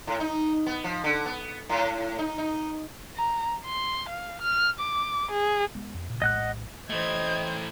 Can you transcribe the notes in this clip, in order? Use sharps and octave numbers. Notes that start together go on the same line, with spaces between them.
A2
D#4
B3
F3
D3
B3
A2
D#4
D#4
A#5
C6
F5
F6
D6
G#4
G#3 B3
F2
A#2 C#3
A#1 A2 G#3 D#5 F#5 F#6
E3 A3 C5 D#5 G5 G#6